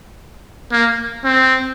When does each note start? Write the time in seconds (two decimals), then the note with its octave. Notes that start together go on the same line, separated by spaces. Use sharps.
0.72 A#3
1.24 C4